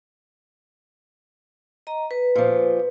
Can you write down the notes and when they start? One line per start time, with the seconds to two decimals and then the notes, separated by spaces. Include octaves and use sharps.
1.87 D#5 A#5
2.11 B4
2.35 A#2 F3